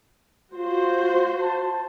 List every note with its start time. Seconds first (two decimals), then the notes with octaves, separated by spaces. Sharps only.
0.55 F4 F#4 C5
1.42 A5